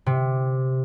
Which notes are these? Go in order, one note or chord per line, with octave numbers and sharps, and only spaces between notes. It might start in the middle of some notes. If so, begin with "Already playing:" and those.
C3